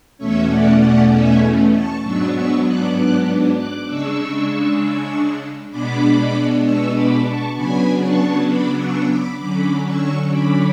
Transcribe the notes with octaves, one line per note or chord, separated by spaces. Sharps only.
E2 B2 A3 C#4 C#5 E5
D5 F#5
D5 F#5
E5 G#5
A5 C#6
G#2 F#3 B3 D4 C#6 E6
C#6 E6
D6 F#6
D6 F#6
D6 F#6
C#3 G#3 D4 C#6 E6
B2 G#3 B3 D4 B5 D6
C#6 E6
B5 D6
A5 C#6
C#3 F#3 B3 D4 G#5 B5
A5 C#6
B5 D6
C#6 E6
B5 D6
D3 F#3 C#4 B5 D6
C#6 E6
B5 D6